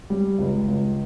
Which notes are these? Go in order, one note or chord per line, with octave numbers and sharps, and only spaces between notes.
G3
C#2
C#2